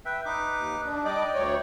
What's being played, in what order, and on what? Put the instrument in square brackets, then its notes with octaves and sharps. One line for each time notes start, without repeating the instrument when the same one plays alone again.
[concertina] B4 E5 G5
D#4 B4 D6
[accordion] D#2
D4
[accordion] G3 D#5 D6 [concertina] D5 G5
[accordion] D2 C#5